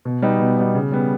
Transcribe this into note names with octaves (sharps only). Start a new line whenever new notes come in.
B2
G3 B3 D#4
B2
G3 B3 D#4
C#3
G3 B3